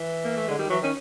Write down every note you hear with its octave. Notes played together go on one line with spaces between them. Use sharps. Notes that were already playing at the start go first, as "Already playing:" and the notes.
Already playing: E3
A#3
A3
D3 G#3
D#3 G3
E3 F#3
D#3 C#4